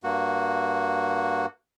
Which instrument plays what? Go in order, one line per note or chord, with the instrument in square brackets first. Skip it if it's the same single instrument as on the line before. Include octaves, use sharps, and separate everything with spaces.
[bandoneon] G2 A#3 F#4